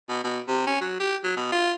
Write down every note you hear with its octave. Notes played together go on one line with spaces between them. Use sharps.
B2
B2
C3
C#4
F#3
G4
F#3
B2
F4